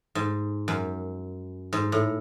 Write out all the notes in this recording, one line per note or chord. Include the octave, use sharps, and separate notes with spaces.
G#2
F#2
G#2
A2